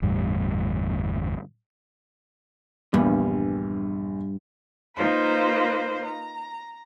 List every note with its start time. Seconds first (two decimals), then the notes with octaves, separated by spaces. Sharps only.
0.02 G1 E2 A2 G3
2.94 A#1 E2 G2 G3
4.95 A#3 D#4 F4 B4 C5
6.05 A#5